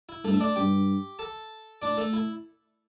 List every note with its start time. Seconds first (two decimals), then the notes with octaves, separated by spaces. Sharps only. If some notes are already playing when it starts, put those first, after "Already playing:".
0.09 E4
0.24 G2 A3 A4
0.34 E5
0.40 D4 D5
0.56 G2 G4 G5
1.19 A4 A5
1.82 A2 D4 D5
1.97 A3 A4
2.13 E4